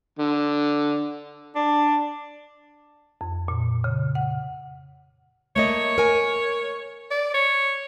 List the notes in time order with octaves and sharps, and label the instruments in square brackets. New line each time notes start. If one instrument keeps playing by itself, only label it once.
[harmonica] D3
[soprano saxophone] D4
[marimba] F2
A#2
C#3
F#5
[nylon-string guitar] A3 A#3 D#5 [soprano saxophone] C#5
[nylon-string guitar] A#4 G#5
[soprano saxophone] D5
C#5